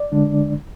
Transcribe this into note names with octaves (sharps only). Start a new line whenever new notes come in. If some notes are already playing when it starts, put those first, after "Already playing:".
Already playing: D5
D3 G#3 D4